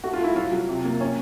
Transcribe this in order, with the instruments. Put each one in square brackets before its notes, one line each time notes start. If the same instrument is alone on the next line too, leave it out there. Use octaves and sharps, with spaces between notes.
[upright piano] A3 F#4
F4
A3 E4
F#3 F4
F#3
C3
A#3
C#4